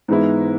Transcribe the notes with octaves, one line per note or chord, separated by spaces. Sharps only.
G#2 E3 G#3 B3 E4